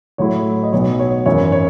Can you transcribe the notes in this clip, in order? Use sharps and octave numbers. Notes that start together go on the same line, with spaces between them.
A2 F#3 A3 E4 C#5
D#5
B1 B2 F#3 B3 C#5
C#5
G#1 F#2 E3 C#5
C#5